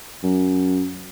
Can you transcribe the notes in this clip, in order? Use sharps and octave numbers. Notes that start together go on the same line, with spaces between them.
F#2